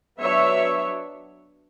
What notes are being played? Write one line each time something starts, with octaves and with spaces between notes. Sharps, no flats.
F#3 B3 D4 C#5 E5